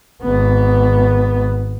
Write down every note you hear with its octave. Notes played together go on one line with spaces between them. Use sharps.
G#1 B3